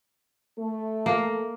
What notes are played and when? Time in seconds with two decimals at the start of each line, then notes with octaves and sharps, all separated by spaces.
0.58 A3 A4
1.06 A#3